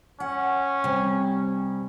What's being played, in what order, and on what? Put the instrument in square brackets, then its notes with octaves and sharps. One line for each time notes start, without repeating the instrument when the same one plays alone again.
[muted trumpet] C#4 [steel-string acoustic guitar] F#5
[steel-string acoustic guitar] C3 G3